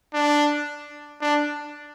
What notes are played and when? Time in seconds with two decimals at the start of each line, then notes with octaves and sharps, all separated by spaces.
0.14 D4
1.22 D4